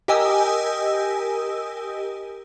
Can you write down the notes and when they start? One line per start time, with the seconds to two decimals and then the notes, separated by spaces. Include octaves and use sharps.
0.08 G4 A#4 D#5 G#5 D#6 E6